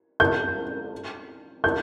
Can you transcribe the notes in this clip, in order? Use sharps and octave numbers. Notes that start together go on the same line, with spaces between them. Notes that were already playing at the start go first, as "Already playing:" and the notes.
G6
G6